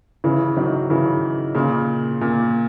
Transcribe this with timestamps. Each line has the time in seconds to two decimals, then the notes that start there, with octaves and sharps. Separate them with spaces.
0.24 C#3 E3
0.57 D#3 F#3
0.90 C#3 E3
1.55 A#2 C#3
2.21 A#2